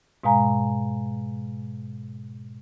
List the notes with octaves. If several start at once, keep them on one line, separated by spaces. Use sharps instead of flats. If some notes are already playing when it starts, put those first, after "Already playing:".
G#2 B2 G#3 F5 G#5 A#5